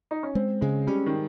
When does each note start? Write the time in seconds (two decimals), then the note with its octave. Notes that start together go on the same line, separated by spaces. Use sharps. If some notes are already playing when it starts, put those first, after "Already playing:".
0.11 D#4
0.23 C#4
0.35 G#3 C4
0.61 C#3 G#3
0.87 G3 C#4
1.06 D#3